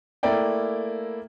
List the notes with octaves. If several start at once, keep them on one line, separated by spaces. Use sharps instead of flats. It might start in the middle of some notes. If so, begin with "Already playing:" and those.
A3 A#3 E4 A#4 D5 G5